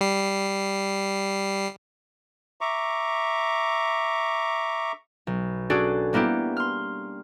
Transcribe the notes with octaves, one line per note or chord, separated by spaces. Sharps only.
G3 C7
E5 A#5 C#6 D6
B1
C#4 D4 F#4 G#4 A4 D5
G3 A#3 B3 E4 G4
C6 F6